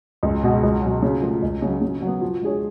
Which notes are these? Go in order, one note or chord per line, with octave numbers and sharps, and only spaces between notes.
C#2
B2 G#3
C#2
B2 F#3
C#3
F3 A3
C#2
C#3 F#3
C#3
F#3
B3
F3
G#3 D4 G#4 C#5